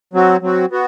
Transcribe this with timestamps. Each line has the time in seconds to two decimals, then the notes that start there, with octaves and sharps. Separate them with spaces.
0.14 F#3 C4 F#4
0.42 F#3 C4 F#4
0.71 B3 F#4